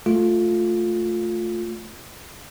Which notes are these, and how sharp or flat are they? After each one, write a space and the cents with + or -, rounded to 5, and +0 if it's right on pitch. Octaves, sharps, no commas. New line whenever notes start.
A3 +0 F4 +10